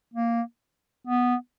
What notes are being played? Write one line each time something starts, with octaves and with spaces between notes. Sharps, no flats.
A#3
B3